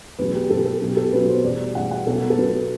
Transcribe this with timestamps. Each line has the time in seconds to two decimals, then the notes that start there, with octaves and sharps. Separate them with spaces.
0.18 E2 B2 F#3 B4
0.34 G4
0.50 E2 B2 F#3 A4
0.65 A4
0.81 B1 B2 F#3 G4
0.97 A4
1.12 B1 B2 F#3 B4
1.28 C5
1.44 E2 B2 G3 D5
1.75 E2 B2 G3 F#5
1.91 F#5
2.06 B1 B2 F#3 A4
2.30 A4
2.38 B1 B2 F#3 B4